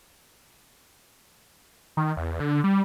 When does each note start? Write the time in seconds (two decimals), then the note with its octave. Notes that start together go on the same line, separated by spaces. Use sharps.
1.97 D#3
2.17 E2
2.40 D3
2.64 G3